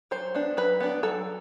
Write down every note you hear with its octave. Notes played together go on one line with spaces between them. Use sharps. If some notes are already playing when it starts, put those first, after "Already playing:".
F#3 C5
B3 D4
F#3 B4
B3 D4
F#3 A4